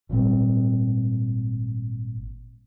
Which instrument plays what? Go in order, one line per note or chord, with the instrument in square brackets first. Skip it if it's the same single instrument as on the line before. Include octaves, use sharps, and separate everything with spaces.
[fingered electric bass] G#1 A#2 G3 C4